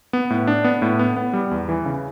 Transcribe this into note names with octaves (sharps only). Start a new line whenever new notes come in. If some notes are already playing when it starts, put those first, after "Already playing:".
B3
A2
D4
B3
A2
B3
B3
G3
E2
E3
C#3